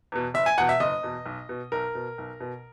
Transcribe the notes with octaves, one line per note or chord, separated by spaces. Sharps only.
E2 B2
F#1 E5
G#5
E2 B2 F#5
E5
F#1 D#5
E2 B2
B1
B2
B1 A#4
B2
B1
B2